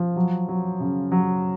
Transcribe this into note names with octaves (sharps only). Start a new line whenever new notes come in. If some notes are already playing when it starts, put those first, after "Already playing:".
Already playing: F3
F#3
F#3
C#3
F#3